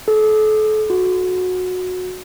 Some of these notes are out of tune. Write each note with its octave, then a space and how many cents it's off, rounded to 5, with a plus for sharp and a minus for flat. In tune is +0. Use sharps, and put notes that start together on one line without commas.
A4 -35
F#4 -15